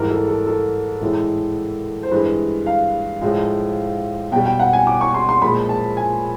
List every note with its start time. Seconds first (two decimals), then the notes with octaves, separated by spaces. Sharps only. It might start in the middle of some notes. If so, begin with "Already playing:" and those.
Already playing: G#2 E3 G3 A#4
0.10 A4
0.28 A4
0.47 A4
1.02 A2 E3 G#3
2.03 C5
2.11 G2 E3 G#3 B4
2.66 F5
3.21 A2 F3 G#3
4.32 B2 G3 G5
4.46 G5
4.59 F#5
4.73 G#5
4.87 D6
5.01 C#6
5.14 C6
5.29 C6
5.42 A#2 F3 G#3 B5
5.69 A5
5.97 G#5